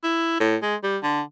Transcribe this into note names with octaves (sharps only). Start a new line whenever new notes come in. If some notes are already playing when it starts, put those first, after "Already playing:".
E4
A2
G#3
G3
D3